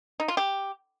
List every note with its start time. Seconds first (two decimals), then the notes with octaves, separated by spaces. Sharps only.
0.20 D#4
0.28 F4
0.37 G4